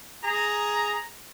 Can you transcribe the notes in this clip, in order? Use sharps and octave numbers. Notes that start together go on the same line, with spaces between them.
G#4 A#5